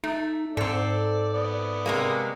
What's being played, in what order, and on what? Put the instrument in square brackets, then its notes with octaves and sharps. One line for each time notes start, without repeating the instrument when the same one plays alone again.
[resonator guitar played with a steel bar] A3 [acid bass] D#4
[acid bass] G#2 [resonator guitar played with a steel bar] C4 A4 [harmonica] D5
[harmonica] B3 D5 D#6
[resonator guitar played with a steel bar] C3 G#3 A#3